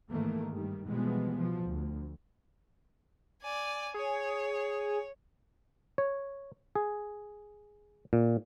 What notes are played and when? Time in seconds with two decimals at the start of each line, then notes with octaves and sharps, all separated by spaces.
0.10 G#2 D#3 E3 A3 A#3
0.51 G2 D#3 G3
0.88 B2 E3 F3 G3 G#3 B3
1.36 B2 F3
1.67 D2
3.42 D5 G#5
3.94 G#4 C#5
5.98 C#5
6.75 G#4
8.13 A#2